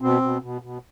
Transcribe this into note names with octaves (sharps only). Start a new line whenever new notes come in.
B2 C4
B2
B2
B2